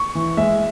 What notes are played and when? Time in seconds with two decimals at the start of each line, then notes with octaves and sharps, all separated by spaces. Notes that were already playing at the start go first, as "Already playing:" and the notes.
Already playing: C#6
0.15 E3
0.37 G#3 E5